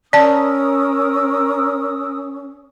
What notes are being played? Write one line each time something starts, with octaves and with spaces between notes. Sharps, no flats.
C#4 A#4 D5 A5 D#6 E6